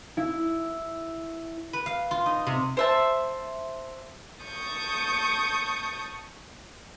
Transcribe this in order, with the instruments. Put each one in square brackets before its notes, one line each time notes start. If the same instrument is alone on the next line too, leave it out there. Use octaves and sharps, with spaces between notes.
[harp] E4
[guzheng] B4
F5
F4
D#4
C3
[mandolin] C5 E5 A5
[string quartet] A5 C#6 D#6 G6